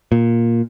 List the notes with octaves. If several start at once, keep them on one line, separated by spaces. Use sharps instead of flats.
A#2